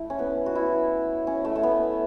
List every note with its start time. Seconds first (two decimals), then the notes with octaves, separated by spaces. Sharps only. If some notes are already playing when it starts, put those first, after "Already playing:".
Already playing: A3 E4
0.10 C#4
0.19 B3
0.46 F#4
0.55 E4
1.27 C#4
1.45 A3
1.56 A3
1.63 B3